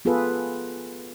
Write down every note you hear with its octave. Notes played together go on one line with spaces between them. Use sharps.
B3 F4 G#4 A4 B4